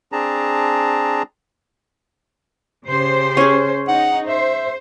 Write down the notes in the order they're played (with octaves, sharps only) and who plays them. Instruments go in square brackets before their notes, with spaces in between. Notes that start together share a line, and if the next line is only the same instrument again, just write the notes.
[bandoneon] C4 D4 G#4 A5 A#5
[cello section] C#3 C5 [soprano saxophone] G4
[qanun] C#4 G#4
[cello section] D#4 [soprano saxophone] F#5
[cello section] C5 [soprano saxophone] E5